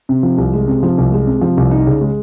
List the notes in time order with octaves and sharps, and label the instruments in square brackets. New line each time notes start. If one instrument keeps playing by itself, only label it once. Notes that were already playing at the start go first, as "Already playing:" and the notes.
[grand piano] C3
F3
C2
G#3
C3
F3
C2
G#3
C3
F3
C2
D#4
C#3
G#3